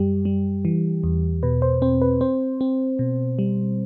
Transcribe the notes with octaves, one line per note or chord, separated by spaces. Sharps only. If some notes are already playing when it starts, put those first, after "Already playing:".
Already playing: F#2 G3 G4
G3
E3
E2
B2 B4
C5
C4 C5
B4
C4 C5
C4
B2
G3